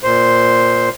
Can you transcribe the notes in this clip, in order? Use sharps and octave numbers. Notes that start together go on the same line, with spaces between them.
A#2 C5